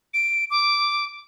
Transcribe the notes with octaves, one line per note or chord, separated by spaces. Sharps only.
D7
D6